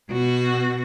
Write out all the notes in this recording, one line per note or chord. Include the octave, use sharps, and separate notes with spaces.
B2 F#4